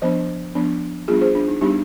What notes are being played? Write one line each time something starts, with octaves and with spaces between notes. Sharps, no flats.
F3 B3 D4 C5 D#5
F3 B3 D4
G3 B3 D4 F4 G#4
G#4 C5
D4
D#4
G3 B3 D4 D#4 G4